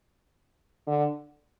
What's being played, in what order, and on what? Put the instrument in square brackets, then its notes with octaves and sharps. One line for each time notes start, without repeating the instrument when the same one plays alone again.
[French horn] D3